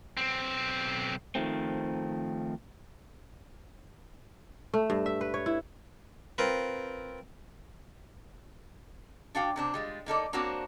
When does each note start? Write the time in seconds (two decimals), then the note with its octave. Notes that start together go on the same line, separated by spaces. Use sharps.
0.17 B1 C4
1.35 D#3 F3 A3 C4
4.74 A3
4.90 G2
5.06 E5
5.21 B4
5.34 C#5
5.46 E4
6.38 C4 F4 A#4 B4
9.35 D4 F#4 F5 G5
9.56 C3 C4 D4
9.74 G3 G#3 F4
10.06 A#3 D#4 A4 D5
10.33 A#3 C4 D4 F#4 C5 C#5